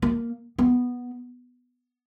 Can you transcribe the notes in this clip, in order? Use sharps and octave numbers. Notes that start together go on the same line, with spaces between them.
A#3
B3